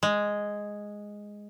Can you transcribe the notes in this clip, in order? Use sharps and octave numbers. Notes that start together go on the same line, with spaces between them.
G#3